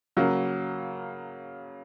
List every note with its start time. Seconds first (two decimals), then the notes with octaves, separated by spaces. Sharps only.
0.17 C#3 F#3 A#3